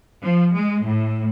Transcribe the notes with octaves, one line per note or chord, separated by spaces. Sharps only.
F3
G#3
A2